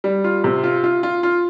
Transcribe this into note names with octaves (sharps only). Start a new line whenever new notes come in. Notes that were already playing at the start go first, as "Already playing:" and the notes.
G3
F4
C3
F4
F4
F4
F4